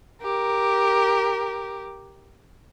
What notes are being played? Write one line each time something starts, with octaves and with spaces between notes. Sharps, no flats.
G4 A#4